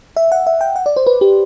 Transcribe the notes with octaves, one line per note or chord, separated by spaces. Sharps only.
E5
F#5
E5
G5
F#5
D5
C5
B4
G4